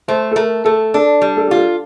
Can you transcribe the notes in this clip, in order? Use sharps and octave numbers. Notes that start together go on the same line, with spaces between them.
A3 C5
A4
A3 A#4
A3 A4
D4 A4
G3
A4
F4 G4
A4